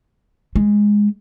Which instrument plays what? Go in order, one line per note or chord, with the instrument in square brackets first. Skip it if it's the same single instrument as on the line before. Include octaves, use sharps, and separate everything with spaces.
[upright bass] G#3